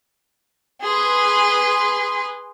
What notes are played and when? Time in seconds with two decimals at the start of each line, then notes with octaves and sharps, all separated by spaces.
0.84 G#4 B4 C6